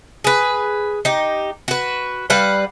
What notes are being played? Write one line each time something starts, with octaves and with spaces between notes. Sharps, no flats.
G#4 B4
D#4 G4
F#4 B4
G3 B4 F5 F#5